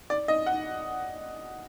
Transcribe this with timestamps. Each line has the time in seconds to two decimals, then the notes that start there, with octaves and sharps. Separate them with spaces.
0.10 D5
0.28 D#5
0.46 F#5